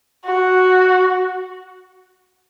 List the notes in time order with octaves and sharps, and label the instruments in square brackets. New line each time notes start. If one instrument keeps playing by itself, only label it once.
[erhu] F#4